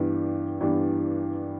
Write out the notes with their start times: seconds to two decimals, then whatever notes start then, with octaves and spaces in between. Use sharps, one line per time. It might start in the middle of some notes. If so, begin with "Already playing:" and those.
Already playing: G2 E3 B3 D4 G4
0.61 G2 E3 B3 D4 G4